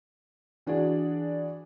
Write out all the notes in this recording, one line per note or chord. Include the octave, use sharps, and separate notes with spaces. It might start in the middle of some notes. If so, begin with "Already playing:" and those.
E3 D4 F#4 G#4 D5